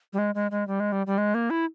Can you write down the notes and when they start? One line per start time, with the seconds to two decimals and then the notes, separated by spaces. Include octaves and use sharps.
0.13 G3
0.18 G#3
0.35 G#3
0.51 G#3
0.67 G3
0.80 G#3
0.92 G3
1.07 G3
1.18 G#3
1.34 A#3
1.50 E4